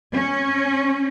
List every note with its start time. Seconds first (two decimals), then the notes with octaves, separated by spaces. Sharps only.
0.14 C#4